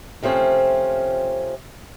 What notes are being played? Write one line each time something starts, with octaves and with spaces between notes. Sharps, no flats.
C3 F3 A3 C4 C#4